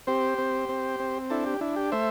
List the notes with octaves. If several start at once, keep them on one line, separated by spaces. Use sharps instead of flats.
C4 G4 C5
C4
C4
C4
D4 E4 A4
G4
D4 E4
G4
A3 C5 E5